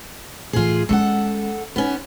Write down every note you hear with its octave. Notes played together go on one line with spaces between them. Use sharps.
A2 E3 F4 G#4
G#3 C#4 A4 F#5
B3 C#4 D#4